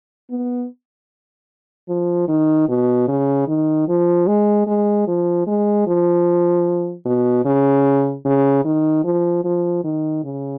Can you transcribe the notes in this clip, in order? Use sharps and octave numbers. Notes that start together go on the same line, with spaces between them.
B3
F3
D#3
B2
C#3
D#3
F3
G#3
G#3
F3
G#3
F3
B2
C#3
C#3
D#3
F3
F3
D#3
C#3